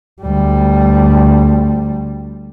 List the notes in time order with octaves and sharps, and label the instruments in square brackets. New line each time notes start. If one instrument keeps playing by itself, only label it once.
[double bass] D2 G3